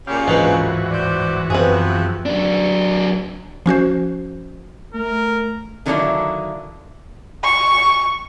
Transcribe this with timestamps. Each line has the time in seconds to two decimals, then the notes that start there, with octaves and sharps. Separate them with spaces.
0.07 A#2 C#3 G4 F5
0.27 D1 G#2 E3 F3 G#3 D4 F#4 B4
0.91 C5 D5
1.50 F#2 C3 F3 B3 G#4 B4
2.26 F#3 D4
3.66 F3 C#4 F#4 C5
4.94 A3 A#4
5.86 D3 D#3 F#3 A#3 D4 E4
7.44 C#6